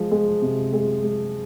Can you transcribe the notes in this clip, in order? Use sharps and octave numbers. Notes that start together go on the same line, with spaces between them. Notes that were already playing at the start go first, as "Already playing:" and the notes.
Already playing: F3 G#3
G#3
C3
G#3
G#3